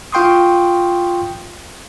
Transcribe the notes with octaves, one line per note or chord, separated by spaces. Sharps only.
F4 F5 G5 C6 C#6 D#6